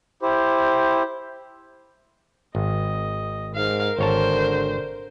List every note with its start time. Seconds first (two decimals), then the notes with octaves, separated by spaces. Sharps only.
0.22 E4 G4 C5
2.55 G#1 D#5
3.55 G#2 A#4 F5
3.99 G#1 D3 C5 C#5 A5